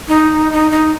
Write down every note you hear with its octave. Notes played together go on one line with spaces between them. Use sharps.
D#4
D#4
D#4